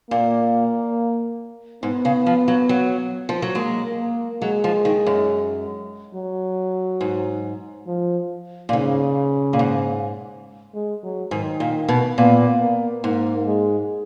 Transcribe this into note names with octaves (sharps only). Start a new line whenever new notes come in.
A#2 A#3
G#2 B3
C#3
F3
F#3
F#3
F3
F#3
G#3 A#3
A#3
F#3 G#3
F3
D#3
F#2
F#3
G#2
F3
A#2
G#2 C#3
A#2
G#2
G#3
F#3
G#2 D#3
A#2
B2
A#2 B3
A#3
G#2 A#3
G#3